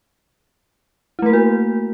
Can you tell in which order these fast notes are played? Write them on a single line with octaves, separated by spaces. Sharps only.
E4 A3 A#4 A#3 F#4